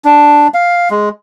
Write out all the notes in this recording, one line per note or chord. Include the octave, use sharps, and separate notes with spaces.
D4
F5
G#3